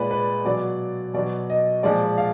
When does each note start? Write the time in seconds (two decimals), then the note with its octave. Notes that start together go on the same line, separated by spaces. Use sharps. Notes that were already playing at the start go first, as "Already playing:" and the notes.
Already playing: A#2 G#3 B4 D5
0.11 B4
0.45 B2 F#3 D5
1.14 B2 F#3 D5
1.50 D#5
1.83 A#2 F3 G#3 D5
2.18 F5